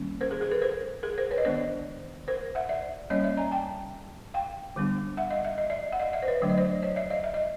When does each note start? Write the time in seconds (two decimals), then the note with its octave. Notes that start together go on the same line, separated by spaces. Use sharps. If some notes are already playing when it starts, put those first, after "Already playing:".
Already playing: D#3 G3 A#3 C#4
0.21 A#4 C5
0.31 G#4 A#4
0.41 G#4 A#4
0.51 A4 B4
0.62 A#4 C5
1.03 G#4 A#4
1.18 A#4 C5
1.31 B4 C#5
1.38 D#5
1.45 D#3 G#3 B3 D4 C5 D5
2.28 A#4 C5
2.55 E5 F#5
2.69 D5 E5
3.10 G3 A#3 C#4 C#5 D#5
3.24 D5 E5
3.37 G#5 A#5
3.52 G5 A5
4.34 F5 G5
4.76 D3 G3 B3 D4
5.17 E5 F#5
5.31 D#5 F5
5.45 E5
5.58 D#5
5.70 D5 E5
5.92 F#5
6.00 D#5 F5
6.13 D5 E5
6.22 C5
6.27 B4 C#5
6.42 D3 F#3 A3 D4 D5
6.50 D#5
6.58 C5 D5
6.82 C#5 D#5
6.96 D5 E5
7.10 D#5 F5
7.24 E5
7.34 D#5